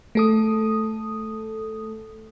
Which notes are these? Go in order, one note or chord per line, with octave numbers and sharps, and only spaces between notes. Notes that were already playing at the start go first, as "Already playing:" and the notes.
A3 A4 D#6